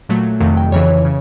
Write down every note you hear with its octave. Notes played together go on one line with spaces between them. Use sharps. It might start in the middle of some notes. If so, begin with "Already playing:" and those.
A#2 F#3 A3
F2 C3 D#3 F#3 A3
G5
F2 C#3 E3 C#5
C#3